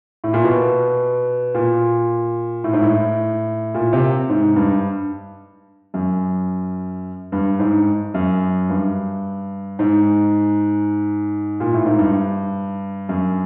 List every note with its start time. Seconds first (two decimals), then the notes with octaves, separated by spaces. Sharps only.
0.24 A2
0.34 A#2
0.45 B2
1.55 A#2
2.64 A2
2.73 G#2
2.82 A2
3.74 A#2
3.93 C3
4.29 G#2
4.56 G2
5.94 F#2
7.32 G2
7.59 G#2
8.14 F#2
8.69 G2
9.79 G#2
11.60 A#2
11.74 A2
11.86 G#2
11.99 G2
13.09 F#2